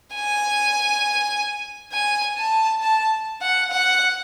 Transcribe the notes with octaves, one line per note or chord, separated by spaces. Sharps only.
G#5
G#5
A5
A5
F#5
F#5